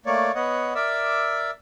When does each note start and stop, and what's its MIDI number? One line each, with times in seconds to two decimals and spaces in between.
0.06 0.32 57
0.06 0.32 58
0.06 0.32 73
0.06 0.32 74
0.35 0.74 59
0.35 0.74 73
0.35 0.74 75
0.35 0.74 78
0.75 1.51 70
0.75 1.51 74
0.75 1.51 76
0.75 1.51 86
0.75 1.51 88